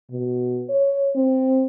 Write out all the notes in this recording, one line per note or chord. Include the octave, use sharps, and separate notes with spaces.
B2
C#5
C4